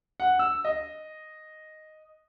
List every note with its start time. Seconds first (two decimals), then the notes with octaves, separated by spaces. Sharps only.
0.20 F#5
0.39 E6
0.64 D#5